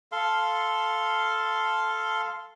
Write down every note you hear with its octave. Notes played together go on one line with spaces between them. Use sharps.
A4 F5 C6